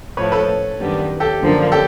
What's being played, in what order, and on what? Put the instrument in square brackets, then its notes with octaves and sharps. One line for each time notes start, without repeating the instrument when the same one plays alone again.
[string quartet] A2 F3 A3 [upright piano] B4 C#5
[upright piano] A4 B4
[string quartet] F#2 D#3 G3 B3 D4
[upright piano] G4 A4
[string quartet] F#2 D3 F3 A#3 D4
[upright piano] G4 A4